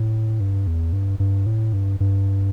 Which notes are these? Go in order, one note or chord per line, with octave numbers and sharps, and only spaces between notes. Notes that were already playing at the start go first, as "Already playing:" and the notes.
Already playing: A2
G2
E2
G2
G2
A2
G2
G2